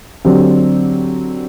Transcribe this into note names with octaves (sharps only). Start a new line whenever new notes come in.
D3 F#3 C4 G4